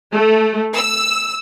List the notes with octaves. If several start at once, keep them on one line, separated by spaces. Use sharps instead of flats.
A3
E6